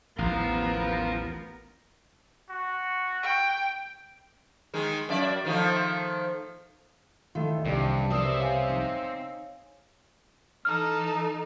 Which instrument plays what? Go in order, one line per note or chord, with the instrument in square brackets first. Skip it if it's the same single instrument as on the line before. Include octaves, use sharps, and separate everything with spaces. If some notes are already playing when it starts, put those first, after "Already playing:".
[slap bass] A1 D#2 [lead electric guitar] F3 F4 [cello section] B3 A#4
[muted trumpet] F#4
[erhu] G5
[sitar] D#3 G#3
F#2 D5 E5
D#3 F3 A3
[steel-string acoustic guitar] D#3 [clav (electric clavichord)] A3 E4 F4
[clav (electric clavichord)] C2 G3 [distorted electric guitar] G2
[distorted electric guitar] C4 E5 [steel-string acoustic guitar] G4 A#4 B4 [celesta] D5 D#6
[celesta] C#5 F5 G#5
[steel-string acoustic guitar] D#4
[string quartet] E3 D#4 A4 [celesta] F6